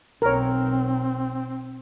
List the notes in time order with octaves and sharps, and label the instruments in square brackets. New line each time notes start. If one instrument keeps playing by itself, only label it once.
[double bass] B1 [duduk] C4 [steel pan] A#4 C#5